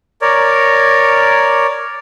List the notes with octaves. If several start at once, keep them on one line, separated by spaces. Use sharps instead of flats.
A#4 C#5 D5